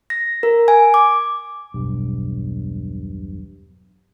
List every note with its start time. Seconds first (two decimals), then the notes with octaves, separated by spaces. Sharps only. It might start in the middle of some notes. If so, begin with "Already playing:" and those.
0.10 A#6
0.43 A#4
0.68 G#5
0.94 D6
1.74 E1 B1 G2